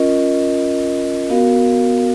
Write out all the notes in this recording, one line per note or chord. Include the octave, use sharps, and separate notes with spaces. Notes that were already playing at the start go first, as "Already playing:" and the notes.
Already playing: C#4 F4 A#4 D#5
B3 F#4 A#4 F5